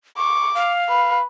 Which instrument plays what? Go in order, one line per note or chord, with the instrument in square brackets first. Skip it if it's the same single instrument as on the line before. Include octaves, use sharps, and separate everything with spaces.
[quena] C#6 [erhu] D6
[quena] F5
[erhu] B4